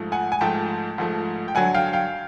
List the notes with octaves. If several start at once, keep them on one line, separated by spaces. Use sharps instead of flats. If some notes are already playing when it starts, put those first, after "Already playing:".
Already playing: G#2 F3 A3
F#5 G#5
G#5
G#2 F3 A3 G5 A5
G#2 F3 A3
G5
G2 D3 F#3 F#5 G#5
F5 G5
F5 G5